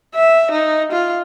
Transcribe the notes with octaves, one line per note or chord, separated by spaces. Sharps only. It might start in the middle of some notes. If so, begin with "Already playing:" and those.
E5
D#4
F4